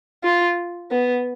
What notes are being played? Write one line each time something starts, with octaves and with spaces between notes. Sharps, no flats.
F4
B3